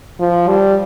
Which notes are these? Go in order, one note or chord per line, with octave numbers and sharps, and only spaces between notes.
F3
G3